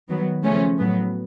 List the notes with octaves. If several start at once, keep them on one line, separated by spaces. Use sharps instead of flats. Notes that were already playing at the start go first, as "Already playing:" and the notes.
D#3 F#3 B3
C#3 F3 A3 C#4
A2 F#3 B3